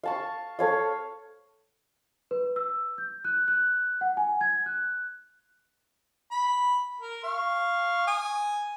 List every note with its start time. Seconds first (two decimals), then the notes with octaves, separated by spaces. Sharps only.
0.03 F5 A5 C#6
0.59 A4 C#5 F5
2.31 B4
2.56 E6
2.98 G6
3.25 F#6
3.48 F#6
4.01 F#5
4.17 G#5
4.41 G#6
4.66 F#6
6.31 B5
7.01 A#4
7.23 F5 C#6
8.07 G#5 D#6